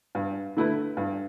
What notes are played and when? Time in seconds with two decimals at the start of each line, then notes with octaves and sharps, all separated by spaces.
0.15 G2
0.57 D3 A3 E4 B4
0.97 G2